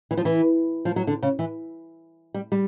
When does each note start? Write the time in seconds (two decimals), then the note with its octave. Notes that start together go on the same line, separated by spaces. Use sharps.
0.11 E3
0.17 F3
0.25 E3
0.85 F3
0.96 F#3
1.07 D3
1.22 C#3
1.39 E3
2.34 G3
2.52 G3